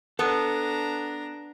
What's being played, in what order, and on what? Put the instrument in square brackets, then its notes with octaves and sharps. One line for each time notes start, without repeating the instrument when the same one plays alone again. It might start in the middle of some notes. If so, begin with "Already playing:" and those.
[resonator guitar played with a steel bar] B3 [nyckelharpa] D4 A#5 [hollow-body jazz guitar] A4